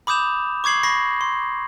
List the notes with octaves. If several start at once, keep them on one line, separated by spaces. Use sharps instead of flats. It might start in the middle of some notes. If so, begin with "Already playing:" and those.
B5 D6 D#6 G6 E7 F7
C#6 D6 G#6 C7 F#7
B5 C#6 D6 A#6 C7
C6